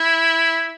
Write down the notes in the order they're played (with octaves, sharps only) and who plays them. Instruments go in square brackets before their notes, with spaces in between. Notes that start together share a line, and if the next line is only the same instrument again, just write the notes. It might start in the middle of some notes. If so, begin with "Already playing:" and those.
Already playing: [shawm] E4